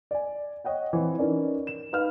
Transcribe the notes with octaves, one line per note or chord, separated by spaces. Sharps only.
D5 G#5
C#5 D#5 F#5 G5
E3 C4
C#4 D#4 A#4 B4 D5
E7
D#4 B4 F5 F6